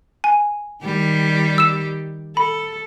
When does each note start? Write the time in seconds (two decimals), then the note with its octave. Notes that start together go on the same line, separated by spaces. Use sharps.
0.24 G#5
0.85 D#3 G3 G4
1.58 E6 E7
2.37 A4 B5